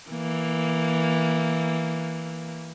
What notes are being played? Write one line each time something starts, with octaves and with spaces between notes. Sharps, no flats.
E3 A#3